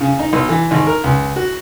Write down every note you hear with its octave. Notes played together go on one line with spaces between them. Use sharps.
C#3
D#4
B1
E3
G#1
A#4
C#2
F#4